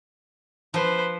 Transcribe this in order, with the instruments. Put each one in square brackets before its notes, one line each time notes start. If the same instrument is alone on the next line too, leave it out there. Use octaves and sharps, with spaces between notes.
[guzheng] F3 [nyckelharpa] B4 C5